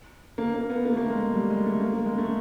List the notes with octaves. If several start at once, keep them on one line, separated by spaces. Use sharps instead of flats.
A#3
A#3
B3
A#3
A3
A#3
G#3
G#3
G3
G#3
A3
A#3
A#3
G#3
A3